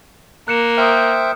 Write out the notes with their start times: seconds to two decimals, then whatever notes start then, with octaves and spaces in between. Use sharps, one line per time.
0.48 A#3 F#6 C#7 E7
0.77 C5 E5 G5 D#6 F6